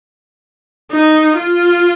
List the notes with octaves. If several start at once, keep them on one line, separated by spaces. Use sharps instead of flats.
D#4
F4